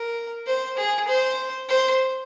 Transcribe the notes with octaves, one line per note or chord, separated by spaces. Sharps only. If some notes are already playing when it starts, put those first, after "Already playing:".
Already playing: A#4
C5
G#4
C5
C5